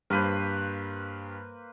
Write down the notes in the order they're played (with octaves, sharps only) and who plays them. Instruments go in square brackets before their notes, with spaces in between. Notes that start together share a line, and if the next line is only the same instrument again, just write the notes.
[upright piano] G2 [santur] A#3 B4 C5